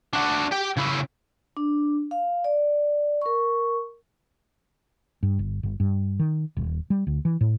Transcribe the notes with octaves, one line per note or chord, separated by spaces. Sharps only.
D4 F#4
G4 G5
C#3 E4
D4
F5
D5
A#4 C#6
G2
G1
G1
G2
D#3
D#1
G3
D2
E3
A2